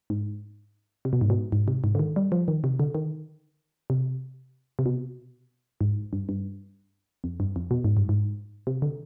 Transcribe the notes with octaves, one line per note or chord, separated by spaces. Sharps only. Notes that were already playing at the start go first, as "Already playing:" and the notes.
G#2
C3
B2
G#2
B2
G#2
C3
G#2
D3
D#3
G3
F3
D#3
C3
D3
D#3
C3
C3
B2
G#2
G2
G2
F2
G2
F2
B2
G#2
G2
G#2
C3
D3